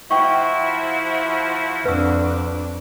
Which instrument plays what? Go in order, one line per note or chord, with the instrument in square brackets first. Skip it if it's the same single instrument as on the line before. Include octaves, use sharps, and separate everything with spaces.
[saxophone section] F3 E4 [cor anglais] F#4 [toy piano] G5 C#6
[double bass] F2 D4 [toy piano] B4 E6